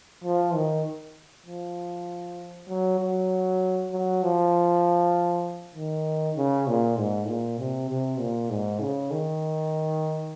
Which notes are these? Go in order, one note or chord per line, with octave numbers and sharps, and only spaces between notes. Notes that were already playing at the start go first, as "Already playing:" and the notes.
F3
D#3
F3
F#3
F#3
F#3
F3
D#3
C#3
A#2
G#2
A#2
C3
C3
A#2
G#2
C#3
D#3